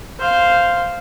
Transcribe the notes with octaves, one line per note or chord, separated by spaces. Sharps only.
C5 F5